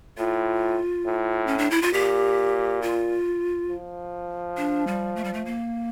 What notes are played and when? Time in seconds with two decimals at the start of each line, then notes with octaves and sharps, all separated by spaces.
0.18 A2 F4
1.06 A2
1.47 C#4
1.58 D4
1.71 E4
1.82 F4
1.93 A#2 G4
2.82 F4
3.69 F3
4.57 D4
4.87 G3
5.16 A3
5.24 G3
5.34 A3
5.45 A#3